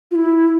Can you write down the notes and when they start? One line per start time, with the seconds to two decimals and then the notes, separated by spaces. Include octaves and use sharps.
0.11 F4
0.15 E4